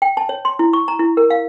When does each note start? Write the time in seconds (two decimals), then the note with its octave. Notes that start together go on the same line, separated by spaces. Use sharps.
0.02 G5
0.17 A5
0.29 C#5
0.45 C6
0.59 E4
0.73 C#6
0.88 A#5
1.00 E4
1.17 A#4
1.30 F5